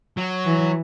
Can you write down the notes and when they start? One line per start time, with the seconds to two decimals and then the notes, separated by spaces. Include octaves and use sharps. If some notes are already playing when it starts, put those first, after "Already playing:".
0.17 F#3
0.46 E3